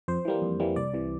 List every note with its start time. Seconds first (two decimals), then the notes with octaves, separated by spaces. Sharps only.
0.08 F2 C5
0.25 E3 G3 A#3
0.42 F2
0.60 E3 G3 A#3
0.76 C2 D5
0.93 C3 E3